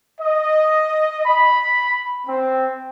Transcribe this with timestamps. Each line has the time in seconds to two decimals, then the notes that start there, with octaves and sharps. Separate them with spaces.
0.21 D#5
1.26 B5
2.27 C4